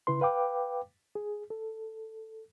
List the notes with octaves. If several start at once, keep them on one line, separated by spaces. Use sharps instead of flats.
C#3 E4 B4 C6
B4 F5 G5 D6
G#4
A4